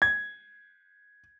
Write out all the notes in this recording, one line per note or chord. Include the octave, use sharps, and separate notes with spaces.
G#6